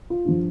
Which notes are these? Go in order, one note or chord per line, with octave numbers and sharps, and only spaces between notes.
F4
G2 F3